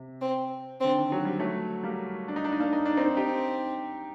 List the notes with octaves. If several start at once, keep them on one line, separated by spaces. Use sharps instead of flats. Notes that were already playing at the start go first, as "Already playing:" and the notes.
Already playing: C3
C4
D3 C4
D#3
F#3
G3
F#3 A3
G3 A#3
D4
D#4
D4
D#4
A#3 D4
D#4
D4
C4 D#4
C4 D#4 G4